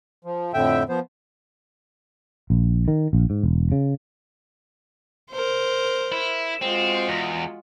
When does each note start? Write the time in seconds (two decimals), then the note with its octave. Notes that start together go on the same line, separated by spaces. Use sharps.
0.25 F3
0.54 F2 A2 D3 E5 G5
0.89 F3 B3 C5
2.50 A#1
2.88 D#3
3.13 A#1
3.30 G#2
3.43 E1
3.72 C#3
5.31 A#4 C5
6.12 E4
6.62 G#3 C4 F4 F#4
7.09 E2